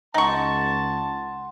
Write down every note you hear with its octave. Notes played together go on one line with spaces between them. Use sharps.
C#2 D#4 F#5 A5 C6 C#6